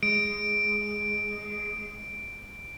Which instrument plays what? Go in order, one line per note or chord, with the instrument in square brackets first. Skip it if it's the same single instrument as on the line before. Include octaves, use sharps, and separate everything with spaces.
[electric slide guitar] G#3 [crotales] D7